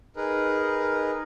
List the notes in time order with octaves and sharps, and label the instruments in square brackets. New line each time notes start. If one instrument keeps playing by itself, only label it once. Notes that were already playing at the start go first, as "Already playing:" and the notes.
[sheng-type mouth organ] D#4 G#4 A#4 B4